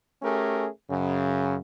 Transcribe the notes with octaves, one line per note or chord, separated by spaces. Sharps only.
A3 C#4 G4 G#4 A#4
F#2 C#3